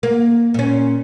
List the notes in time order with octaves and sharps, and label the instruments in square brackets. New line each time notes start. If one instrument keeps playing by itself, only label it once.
[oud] A#3
A#2 C#4